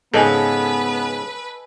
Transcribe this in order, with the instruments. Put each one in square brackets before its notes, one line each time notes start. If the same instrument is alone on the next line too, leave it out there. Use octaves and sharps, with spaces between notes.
[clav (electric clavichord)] G#2 C#3 [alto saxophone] B3 [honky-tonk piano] A4 D#5 G#5 [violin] B4